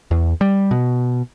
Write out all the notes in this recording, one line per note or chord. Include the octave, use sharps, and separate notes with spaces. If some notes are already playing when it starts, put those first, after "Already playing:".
E2
G3
B2